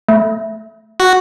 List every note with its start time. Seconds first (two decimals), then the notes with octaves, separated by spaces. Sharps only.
0.09 A3
1.00 F#4